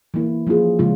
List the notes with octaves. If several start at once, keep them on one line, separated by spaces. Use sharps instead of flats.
E3 A#3 E4
F3 A#3 C#4 F4 G#4
C#3 F3 G#3 C#4 F4